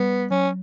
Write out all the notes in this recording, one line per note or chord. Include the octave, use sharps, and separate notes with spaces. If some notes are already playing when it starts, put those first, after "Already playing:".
Already playing: G3 B3
F#3 C#4